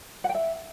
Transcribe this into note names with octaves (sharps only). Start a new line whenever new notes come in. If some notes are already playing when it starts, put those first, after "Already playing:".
F#5
G5
E5